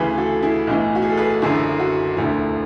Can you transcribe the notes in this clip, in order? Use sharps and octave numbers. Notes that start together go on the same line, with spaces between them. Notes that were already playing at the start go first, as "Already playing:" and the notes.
Already playing: D2 C#3 E3 G#4 B4
F#4 A4
E4 G#4
B1 A2 E3
F#4
G#4
A4
G#4 B4
F#1 F#2 D3 E4 G#4
F#4
E1 D2 D3 E4